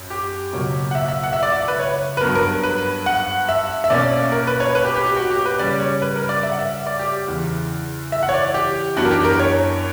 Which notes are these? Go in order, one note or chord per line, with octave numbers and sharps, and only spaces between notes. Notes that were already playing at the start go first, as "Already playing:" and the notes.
Already playing: F#2
G4
C#2 B2 F#3 A#3
F#5
E5
E5
F#5
E5
D5
E5
B4
C#5
B4
G2 F#3 B3 A#4
A#4
B4
F#5
E5
E5
B2 A#3 C#4 D5
A#4
B4
C#5
B4
G4
G4
G4
F#4
G4
B4
C#3 G3 C#4 D5
C#5
B4
A#4
D5
E5
F#5
E5
D5
G4
E2 C#3 E3
E5
F#5
C#5
D5
G4
F#2 E3 B3 D4 F#4
A#4
G4
A#4
C#5